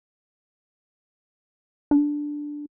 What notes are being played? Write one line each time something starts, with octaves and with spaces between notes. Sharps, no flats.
D4